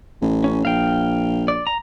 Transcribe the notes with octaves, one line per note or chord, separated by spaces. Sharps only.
A1
C#4
A#1 F5 G5
D5
A#5